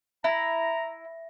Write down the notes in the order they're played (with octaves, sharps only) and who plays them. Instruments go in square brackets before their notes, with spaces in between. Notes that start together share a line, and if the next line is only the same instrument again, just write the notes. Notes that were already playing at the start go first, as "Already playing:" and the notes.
[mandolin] E4 [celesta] E5 A#6 [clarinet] A#5